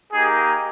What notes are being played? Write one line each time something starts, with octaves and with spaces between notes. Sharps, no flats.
A#3 D#4 G4 G#4